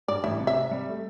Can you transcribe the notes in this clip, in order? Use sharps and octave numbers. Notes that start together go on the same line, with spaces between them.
G2 D5
A1 E5
C3
E5
C3
G3
A3